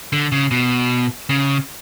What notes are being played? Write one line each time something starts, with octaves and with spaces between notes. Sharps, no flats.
D3
C#3
B2
C#3